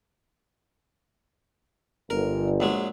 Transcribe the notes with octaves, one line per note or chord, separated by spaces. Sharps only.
G1 A#4
A#1 F#3 G#3